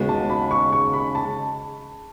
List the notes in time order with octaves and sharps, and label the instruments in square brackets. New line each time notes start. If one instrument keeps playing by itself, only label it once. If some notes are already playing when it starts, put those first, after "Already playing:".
Already playing: [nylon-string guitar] D#2 C#3 G#3 B3 F#4
[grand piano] A5
B5
C#6
C#6
B5
A5